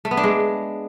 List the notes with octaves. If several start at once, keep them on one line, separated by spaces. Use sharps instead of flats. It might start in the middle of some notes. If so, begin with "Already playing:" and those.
A3
B3
D4
G#3